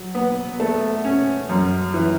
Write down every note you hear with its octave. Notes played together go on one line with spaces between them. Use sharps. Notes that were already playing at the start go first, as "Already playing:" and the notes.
Already playing: F#3
B3
A3
C#4
F#2
E3